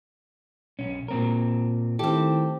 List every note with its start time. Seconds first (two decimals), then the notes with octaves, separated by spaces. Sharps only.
0.79 B1 C#4
1.08 A#2 C4 A#4
1.99 D#3 A3 C4 E4 G4 A4